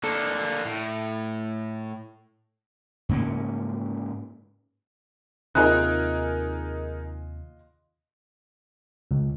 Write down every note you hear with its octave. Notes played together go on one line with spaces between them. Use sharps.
D3 A#3 A4
A2
G#2 C#3 A#3 C#4
D#2 C3 D#4 F4 G#4 A#4 D#5 F#6
C#2